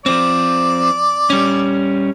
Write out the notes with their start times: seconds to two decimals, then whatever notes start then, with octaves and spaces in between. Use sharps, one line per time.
0.06 F3 C4 D5
1.30 G3 C#4